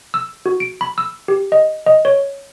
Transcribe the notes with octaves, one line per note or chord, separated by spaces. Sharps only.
E6
F#4
D7
B5
E6
G4
D#5
D#5
C#5